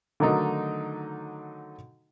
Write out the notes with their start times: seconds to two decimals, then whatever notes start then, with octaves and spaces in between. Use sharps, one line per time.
0.20 D3 D#3 F#3 A3 D#4